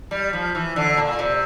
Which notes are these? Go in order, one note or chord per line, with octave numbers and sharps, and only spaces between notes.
G3
F3
E3
D3
A#2
C3